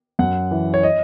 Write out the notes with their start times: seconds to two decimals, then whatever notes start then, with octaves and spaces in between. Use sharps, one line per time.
0.19 F#2 F#5
0.51 E3
0.74 C#5
0.83 D#5